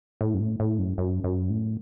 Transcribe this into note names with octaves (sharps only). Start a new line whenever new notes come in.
A2
F#2
A2
A2
F#2
F#2
F#2
A2